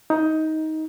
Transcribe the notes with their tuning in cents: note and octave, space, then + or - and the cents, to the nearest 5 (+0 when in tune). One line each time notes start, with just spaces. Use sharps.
D#4 +15